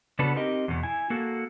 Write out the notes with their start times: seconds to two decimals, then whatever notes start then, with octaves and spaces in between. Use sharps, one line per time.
0.19 C#3 B3 D4 F#4 A4 B4
0.36 C4 D#4 G4 A#4 D#5
0.68 E2 B2
0.83 E4 G#5
1.10 A#3 F#4 A4